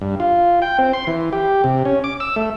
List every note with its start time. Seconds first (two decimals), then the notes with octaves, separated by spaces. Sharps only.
0.01 G2
0.20 F4
0.62 G5
0.79 C4
0.93 C6
1.07 E3
1.33 G4
1.64 C3
1.85 C#4
2.04 D6
2.20 E6
2.36 A3